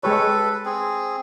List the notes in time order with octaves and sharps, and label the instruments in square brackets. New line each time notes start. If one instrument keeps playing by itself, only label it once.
[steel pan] G#3 G4 C#5 [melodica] A4 B4
[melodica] C4 G#4